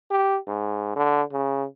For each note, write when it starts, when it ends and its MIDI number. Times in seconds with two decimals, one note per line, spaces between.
0.11 0.38 67
0.47 0.94 44
0.95 1.22 50
1.32 1.66 49